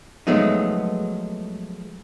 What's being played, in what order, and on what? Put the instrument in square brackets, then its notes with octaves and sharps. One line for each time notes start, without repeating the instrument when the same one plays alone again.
[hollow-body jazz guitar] F3 F#3 G#3 A3 B3 D#4